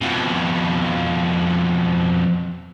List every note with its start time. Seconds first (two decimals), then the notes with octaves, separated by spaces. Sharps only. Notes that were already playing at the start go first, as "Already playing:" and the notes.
0.01 F2 B2